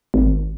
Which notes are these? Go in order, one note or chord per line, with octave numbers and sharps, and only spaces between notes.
G#1